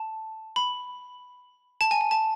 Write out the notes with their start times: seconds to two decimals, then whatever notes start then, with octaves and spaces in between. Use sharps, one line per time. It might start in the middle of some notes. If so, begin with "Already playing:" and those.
Already playing: A5
0.56 B5
1.81 A5
1.91 G#5
2.01 G#5
2.11 A5